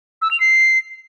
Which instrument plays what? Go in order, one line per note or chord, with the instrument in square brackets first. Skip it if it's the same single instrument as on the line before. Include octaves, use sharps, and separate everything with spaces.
[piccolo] E6
F7
C7